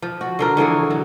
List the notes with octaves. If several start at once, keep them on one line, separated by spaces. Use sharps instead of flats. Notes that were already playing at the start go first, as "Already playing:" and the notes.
F3
F#4
D3 F3 A#4
D3 E3 G#4 C#5
F#3